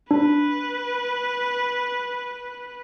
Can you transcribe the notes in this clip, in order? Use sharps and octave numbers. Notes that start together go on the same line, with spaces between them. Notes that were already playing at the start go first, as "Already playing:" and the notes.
D4 B4